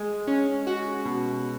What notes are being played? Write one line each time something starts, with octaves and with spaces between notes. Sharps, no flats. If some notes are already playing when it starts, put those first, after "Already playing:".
Already playing: G#3
C#4
F#4
B2